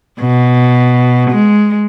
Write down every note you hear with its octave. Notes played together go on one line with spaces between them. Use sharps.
B2
G#3